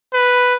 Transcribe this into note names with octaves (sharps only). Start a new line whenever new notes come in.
B4